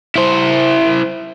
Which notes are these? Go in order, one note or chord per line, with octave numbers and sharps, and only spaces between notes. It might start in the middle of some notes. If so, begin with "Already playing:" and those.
E4 C5